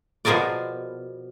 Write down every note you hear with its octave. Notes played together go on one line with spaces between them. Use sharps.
B2 F3 F4 G#4 A#4 D5